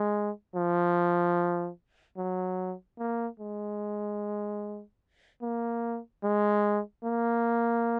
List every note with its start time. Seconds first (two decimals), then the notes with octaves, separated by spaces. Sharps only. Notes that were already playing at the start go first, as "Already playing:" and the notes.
Already playing: G#3
0.55 F3
2.17 F#3
2.99 A#3
3.40 G#3
5.42 A#3
6.24 G#3
7.04 A#3